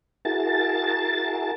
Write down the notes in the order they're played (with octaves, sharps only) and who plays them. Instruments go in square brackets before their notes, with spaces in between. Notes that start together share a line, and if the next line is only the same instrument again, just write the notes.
[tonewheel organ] E4 F#4 G#4 A#4 A5 A6